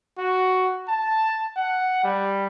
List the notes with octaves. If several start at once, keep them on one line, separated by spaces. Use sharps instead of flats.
F#4
A5
F#5
G3